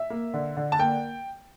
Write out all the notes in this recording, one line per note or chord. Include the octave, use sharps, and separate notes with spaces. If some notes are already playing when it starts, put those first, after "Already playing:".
Already playing: E5
A#3
D3
D3
A5
A#3 G5